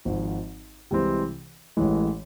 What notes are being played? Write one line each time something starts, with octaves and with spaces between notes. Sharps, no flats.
G#1 G#2 F3
C2 C3 E3 G#3 C4
A1 A2 E3 G#3